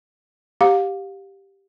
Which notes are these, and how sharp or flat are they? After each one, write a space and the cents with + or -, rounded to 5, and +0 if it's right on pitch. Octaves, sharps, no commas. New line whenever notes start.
G4 +0 F5 +30